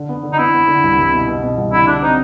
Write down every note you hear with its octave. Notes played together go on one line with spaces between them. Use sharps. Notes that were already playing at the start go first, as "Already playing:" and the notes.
Already playing: D3
B3
D3
D#4
B3 E4
B3
D3
C2
C2
B2
B2
B2
C2
D3 E4
D3 D4
C4 D#4